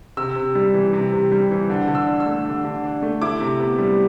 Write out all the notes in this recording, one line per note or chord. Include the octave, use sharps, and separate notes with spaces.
C3 E6
C3
G3
E3
C3
C3
G3
E3
D3
D3
E6
D4
E6
A3
D3
D3
D4
A3
E4 D6
C3
B3
G3